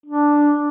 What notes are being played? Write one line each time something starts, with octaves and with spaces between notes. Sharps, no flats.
D4